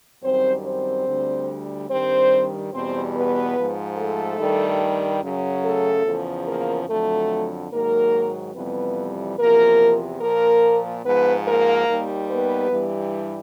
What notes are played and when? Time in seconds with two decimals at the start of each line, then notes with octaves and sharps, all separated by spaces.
0.23 F#2 D#3 G3 C4 C5
0.64 C4 C5
1.07 D2 D3 G3
1.89 G2 D#3 G3 C4 C5
2.73 E2 B2 G3 C4 C5
3.14 B3 B4
3.56 G#2 F3
3.97 A3 A4
4.39 G2 D#3 G3
5.22 F#2 C#3 F#3
5.64 A3 A4
6.05 E2 C#3 F3
6.47 A#3 A#4
6.89 F2 D3 F#3 A3 A4
7.72 G#2 D#3 F#3 A#3 A#4
8.55 F2 C3 E3 G3 B3 B4
9.38 E2 C3 F3 A#3 A#4
10.21 A#2 F3 A#3 A#4
11.04 G#2 F3 B3 B4
11.46 A#3 A#4
11.88 D#2 D#3 G3
12.30 B3 B4
12.71 G2 E3 G3